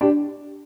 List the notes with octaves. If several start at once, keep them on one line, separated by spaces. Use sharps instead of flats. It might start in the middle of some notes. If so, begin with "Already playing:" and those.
D4 G4